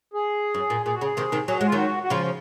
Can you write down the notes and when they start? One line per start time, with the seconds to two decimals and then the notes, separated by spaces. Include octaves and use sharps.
0.14 G#4
0.54 F#2
0.70 A#2
0.86 A#2 G#4
0.94 F#4
1.01 C#3
1.04 G#4
1.17 C3 D#3
1.32 C3 D#3
1.48 F#3 G#4
1.57 G#3 F#4
1.67 F4
1.72 D#3 F#3 F#4
2.03 F#4
2.10 C#3 F3 F4